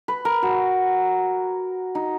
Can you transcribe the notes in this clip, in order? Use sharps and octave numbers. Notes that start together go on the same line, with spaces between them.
B4
A#4
F#4
D#4